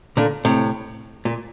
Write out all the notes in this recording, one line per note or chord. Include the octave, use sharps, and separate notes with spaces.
A#2 D3
A2 C3
A#2